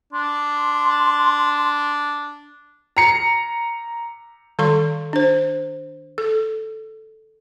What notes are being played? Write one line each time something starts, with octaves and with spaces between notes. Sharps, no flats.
D4 C6
A#5 C#7
D#3 G3 A4 F5 C6 C#6
D4 C5
A4